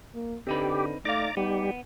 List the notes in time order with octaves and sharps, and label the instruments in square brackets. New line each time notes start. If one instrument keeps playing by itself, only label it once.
[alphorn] A#3
[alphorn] D3 [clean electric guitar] C4 D#4 B4 [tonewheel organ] G4
[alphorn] A3 [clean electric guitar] D#4 F5 [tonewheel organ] D5 A#5 D6
[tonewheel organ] G3 G4 [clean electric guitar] B3 [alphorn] D#4